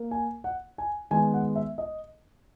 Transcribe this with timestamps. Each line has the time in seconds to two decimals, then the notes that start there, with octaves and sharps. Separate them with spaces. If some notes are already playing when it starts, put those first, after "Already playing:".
Already playing: A#3
0.11 G#5
0.44 F#5
0.78 G#5
1.10 D#3 G#3 B3 G#5
1.34 F#5
1.55 E5
1.78 D#5